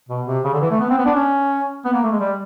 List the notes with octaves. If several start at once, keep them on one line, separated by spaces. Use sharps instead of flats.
B2
C3
C#3
D3
E3
A3
B3
C4
B3
D4
C#4
B3
A#3
A3
G#3
G3